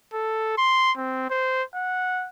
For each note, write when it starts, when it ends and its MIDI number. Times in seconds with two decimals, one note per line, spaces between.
0.14 0.57 69
0.58 0.92 84
0.97 1.28 60
1.30 1.63 72
1.75 2.29 78